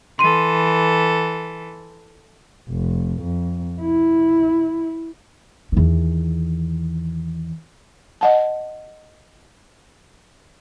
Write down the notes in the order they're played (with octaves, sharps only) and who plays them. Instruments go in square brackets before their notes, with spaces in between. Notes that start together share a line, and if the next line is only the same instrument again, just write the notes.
[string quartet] E3 A4 [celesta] C6 D#7
[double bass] F1
F2
E4
[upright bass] E2 D#3
[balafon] D#5 F#5 A5